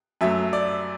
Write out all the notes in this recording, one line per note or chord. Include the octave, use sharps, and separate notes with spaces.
F#2 F#3 A3 E5
D5